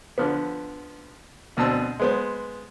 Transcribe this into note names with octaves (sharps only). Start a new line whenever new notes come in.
D3 F3 B3
D2 B2 C4 A5 E6
G#3 B3 C5